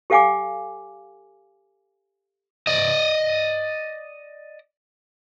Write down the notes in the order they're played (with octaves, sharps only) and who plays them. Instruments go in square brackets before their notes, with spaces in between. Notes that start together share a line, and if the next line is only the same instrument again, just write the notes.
[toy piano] G4 A4 F5 F#5 G#5 D6
[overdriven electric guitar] D5 D#5